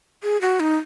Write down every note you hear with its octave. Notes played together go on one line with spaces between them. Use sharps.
G#4
F#4
D#4